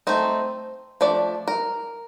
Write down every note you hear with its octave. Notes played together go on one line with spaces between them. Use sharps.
A3 C4 D#4 C5
F3 A3 D4 D5
A#4